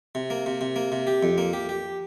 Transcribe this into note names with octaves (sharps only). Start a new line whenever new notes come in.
C3
A#3
C3
C3
A#3
C3
G4
F2
A#3
G4
G4